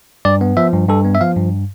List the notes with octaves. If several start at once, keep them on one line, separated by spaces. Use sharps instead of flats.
G2 D5
B3
F3 E5
G2
G2 A4
B3
E5
F3 F5
G2